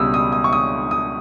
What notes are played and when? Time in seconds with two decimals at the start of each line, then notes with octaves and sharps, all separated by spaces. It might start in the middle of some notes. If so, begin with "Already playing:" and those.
Already playing: C#2 B2 G3 D#6 E6
0.14 D#6
0.32 D#6
0.44 C#6
0.53 D#6
0.91 D#6